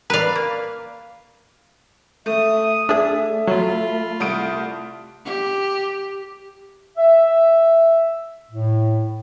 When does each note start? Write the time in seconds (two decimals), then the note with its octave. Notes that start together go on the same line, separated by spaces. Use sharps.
0.10 A#4 B4 D5 F5
0.35 A#3
2.26 A3 E5 D#6
2.89 A3 D4 G#4 E5
3.47 F#3 F4 B5
4.20 C2 D#6 D7
5.25 G4
6.97 E5
8.51 A2